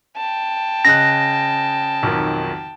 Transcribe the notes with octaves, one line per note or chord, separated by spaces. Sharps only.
G5 A5
C#3 D#5 F#6 A#6
B1 F2 D#3